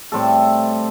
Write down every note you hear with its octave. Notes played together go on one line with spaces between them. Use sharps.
A2 G3 C4 A4